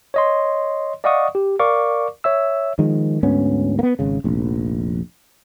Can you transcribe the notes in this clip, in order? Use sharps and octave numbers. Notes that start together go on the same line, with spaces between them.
C#5 D#5 C6
D5 D#5 F5 F#5 C#6 D#6
G4
A#4 D5 F5 C#6 D6
C#5 E5 E6
D#3 F3 G#3
D2 G#2 B3 C#4
A#3 B3
G#1 C#3
F1 A#1